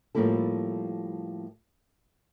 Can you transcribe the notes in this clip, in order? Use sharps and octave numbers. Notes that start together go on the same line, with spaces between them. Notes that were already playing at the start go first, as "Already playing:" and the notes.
A2 F3 G3 A#3 E4 A4